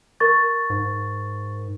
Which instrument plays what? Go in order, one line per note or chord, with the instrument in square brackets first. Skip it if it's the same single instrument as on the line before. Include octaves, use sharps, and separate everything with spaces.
[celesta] A#4 C#6 A6
[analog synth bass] G#2